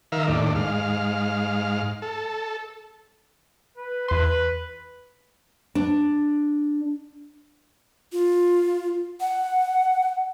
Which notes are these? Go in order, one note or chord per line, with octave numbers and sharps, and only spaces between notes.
D#3 A#4 E5 F5
D#2 A2 D4
G#2 F5
A4
B4
E2 B4 C6
D4
F4
F#5